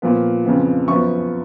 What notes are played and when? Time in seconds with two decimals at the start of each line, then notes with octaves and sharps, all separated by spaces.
0.02 A#2 F3 B3
0.45 F2 C#3 F3 B3
0.88 F#2 F3 B3 C#6